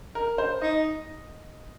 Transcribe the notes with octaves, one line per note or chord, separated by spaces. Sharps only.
A#4
C5
D#4 D#5